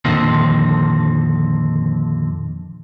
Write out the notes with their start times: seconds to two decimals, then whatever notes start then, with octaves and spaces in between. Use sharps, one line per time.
0.05 F2 A#2 D3 D#3 F3 C4